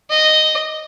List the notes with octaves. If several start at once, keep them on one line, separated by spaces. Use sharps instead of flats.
D#5